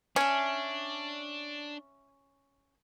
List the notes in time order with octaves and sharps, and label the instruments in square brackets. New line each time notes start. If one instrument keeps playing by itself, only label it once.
[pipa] C#4 [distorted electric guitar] D4 [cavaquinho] E5 G#5